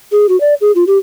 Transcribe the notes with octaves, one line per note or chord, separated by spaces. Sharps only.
G#4
F#4
D5
G#4
F4
G4